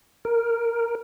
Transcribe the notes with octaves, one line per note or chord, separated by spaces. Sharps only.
A#4